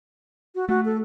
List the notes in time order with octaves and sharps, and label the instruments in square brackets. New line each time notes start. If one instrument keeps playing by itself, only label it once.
[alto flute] F#4
[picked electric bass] A3 [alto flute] F#4
[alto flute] A4